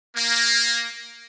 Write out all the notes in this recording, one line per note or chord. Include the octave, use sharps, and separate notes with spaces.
A#3